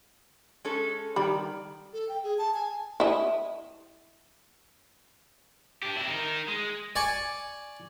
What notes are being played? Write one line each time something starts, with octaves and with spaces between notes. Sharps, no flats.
G#3 C#4 A4
D#3 G3 B5
A4
G5
G#4
A5
G#5
E4 D#5
D4 G4
C4 E4
D#4 A#4
G#3
D5 G#5 C#6